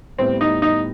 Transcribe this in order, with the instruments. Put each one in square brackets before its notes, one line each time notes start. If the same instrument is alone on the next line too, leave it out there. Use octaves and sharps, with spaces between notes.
[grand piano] A2 G3 B3 [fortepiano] C4
[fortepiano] D#4
D#4